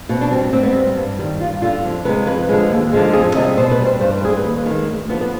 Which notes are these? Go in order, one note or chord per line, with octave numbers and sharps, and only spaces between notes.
B2 C4
D4
G3 C4
G#2 C4
B3
G3 C4
G2
D#3 G3
G2 F4
D3 G3 F4
F2
C3 F3 G#3 B4
F2 B4
D3 F3 G#3
D#2
D3 F3 G#3
F2 G#4
C3 G3 D#5
B2 C5
B4
G3
C5
G2 C5
B4
D3 G3 G#4
B4
D#2
D#3 G#3
D2
D3 F3 B3
B3